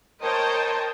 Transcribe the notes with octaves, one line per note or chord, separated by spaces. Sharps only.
A#4 C5 C#5 D#5 G5 A5